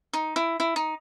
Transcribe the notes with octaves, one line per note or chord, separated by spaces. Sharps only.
D#4
E4
E4
D#4